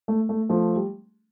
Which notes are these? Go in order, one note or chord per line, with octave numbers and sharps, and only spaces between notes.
A3
A3
F3 A3
G3